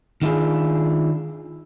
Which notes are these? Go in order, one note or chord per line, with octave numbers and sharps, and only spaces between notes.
D#3 D4 E4 F4 G#4